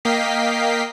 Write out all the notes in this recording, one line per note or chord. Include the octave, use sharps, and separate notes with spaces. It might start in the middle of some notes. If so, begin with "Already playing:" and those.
A#3 D#5 F5 G5 B6 C7